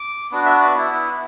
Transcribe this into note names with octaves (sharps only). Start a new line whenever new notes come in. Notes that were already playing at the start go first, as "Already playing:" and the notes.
Already playing: D6
B3 D4 F#4
E5
D5
B3 E4